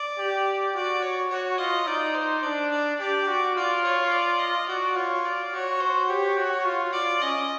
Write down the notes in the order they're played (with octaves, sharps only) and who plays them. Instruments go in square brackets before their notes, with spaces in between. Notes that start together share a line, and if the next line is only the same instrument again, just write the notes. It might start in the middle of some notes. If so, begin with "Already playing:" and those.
Already playing: [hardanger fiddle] D5
[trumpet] G4
[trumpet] F#4 [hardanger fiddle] D5
[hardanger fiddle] C#5
[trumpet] F#4 [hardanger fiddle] C#5
[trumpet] F4 [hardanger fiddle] D#5
[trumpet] D#4 [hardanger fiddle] D5
[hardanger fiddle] C5
[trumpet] D4 [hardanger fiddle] D5
[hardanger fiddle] D5
[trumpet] G4 [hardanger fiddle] D5
[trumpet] F#4
[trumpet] F4 [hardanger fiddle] D5
[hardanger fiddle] C#5
D5
D#5
[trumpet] F#4 [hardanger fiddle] D5
[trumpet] F4 [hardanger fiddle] C#5
[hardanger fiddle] D5
[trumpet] F#4 [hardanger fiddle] C#5
[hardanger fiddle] C5
[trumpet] G4 [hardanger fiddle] C#5
[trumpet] F#4
F4
[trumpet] F4 [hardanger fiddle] D5
[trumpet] C#4 [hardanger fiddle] D#5